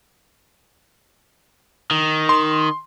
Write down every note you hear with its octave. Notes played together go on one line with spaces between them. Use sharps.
D#3
C6